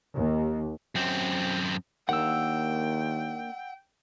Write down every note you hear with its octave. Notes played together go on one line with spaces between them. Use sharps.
D#2
F#2 C4
D#2 A#3 D4 F#5 G5 E6